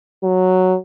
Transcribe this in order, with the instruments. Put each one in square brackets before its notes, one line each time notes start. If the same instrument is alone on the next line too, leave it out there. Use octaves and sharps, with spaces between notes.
[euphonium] F#3